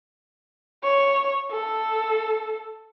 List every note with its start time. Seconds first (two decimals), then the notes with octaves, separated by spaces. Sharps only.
0.84 C#5
1.52 A4